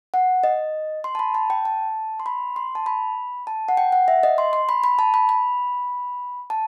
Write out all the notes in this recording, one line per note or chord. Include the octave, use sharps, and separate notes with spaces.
F#5
D#5
C6
A5
B5
A5
G5
A5
C6
B5
C6
A5
B5
A5
F#5
G5
F#5
E5
D#5
C6
C6
B5
B5
A5
B5
B5
A5